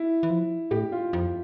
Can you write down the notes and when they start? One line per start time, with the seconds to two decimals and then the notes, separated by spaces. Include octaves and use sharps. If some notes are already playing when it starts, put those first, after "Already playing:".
Already playing: E4
0.23 E3
0.30 F3
0.71 A2 G4
0.92 F4
1.13 F2